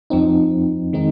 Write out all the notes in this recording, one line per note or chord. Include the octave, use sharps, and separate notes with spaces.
F2 F3 C4 D#4
D#3 G#3 C4 D#4